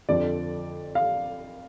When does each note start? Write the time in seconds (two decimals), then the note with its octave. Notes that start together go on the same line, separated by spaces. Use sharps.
0.08 F2 D3 F3 D5
0.95 F5